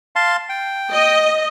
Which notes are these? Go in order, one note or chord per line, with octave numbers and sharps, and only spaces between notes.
F5 A5 C6
G5
D#5